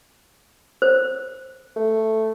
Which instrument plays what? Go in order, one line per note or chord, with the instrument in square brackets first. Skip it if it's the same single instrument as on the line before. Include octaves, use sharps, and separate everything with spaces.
[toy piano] C5
[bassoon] A3